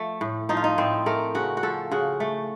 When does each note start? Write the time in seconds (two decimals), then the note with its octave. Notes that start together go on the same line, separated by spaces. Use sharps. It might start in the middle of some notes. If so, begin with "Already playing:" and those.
Already playing: F3 A3
0.21 A2
0.49 F3 D#4
0.57 F4
0.64 D#4
0.78 A2 C4
1.06 A3 A#4
1.35 C#3 F#4
1.57 F#4
1.63 F3 A4
1.91 C#3 F#4
2.20 A3